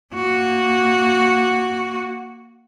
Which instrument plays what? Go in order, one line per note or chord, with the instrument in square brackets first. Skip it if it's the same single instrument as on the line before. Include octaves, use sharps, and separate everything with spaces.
[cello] A#3 F#4